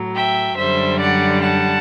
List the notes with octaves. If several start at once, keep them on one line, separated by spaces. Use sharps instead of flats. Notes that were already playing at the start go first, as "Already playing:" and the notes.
Already playing: A2 F#3
E5 G5
F#2 D3 G3 C5 E5
D5 F#5
F#5 A5